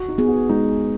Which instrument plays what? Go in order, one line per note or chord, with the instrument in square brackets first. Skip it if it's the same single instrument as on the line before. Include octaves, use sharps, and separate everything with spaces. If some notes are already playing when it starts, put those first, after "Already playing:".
Already playing: [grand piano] F#4
D#4
[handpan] B3 G#4
[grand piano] F#4
[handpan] G#3 [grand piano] D#4